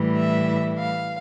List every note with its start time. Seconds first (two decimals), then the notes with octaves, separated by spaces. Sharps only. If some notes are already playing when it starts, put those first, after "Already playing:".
Already playing: A2 E3 G3
0.16 E5
0.77 F5